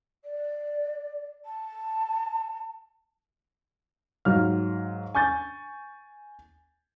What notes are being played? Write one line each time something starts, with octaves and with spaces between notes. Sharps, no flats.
D5
A5
G#2 F#3 F4 F6
G#5 C#6 G6 A6